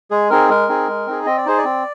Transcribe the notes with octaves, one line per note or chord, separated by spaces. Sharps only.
G#3 G#4
C4 D#4 G#4 A#4
G#3 A#4
C4 D#4 G#4
G#3
C4 D#4 G#4
C4 D#5
D5
D#4 G#4 C5
D5
C4